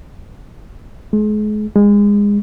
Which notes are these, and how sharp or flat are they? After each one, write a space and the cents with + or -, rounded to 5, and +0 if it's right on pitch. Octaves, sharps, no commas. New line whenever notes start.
G#3 +35
G#3 -25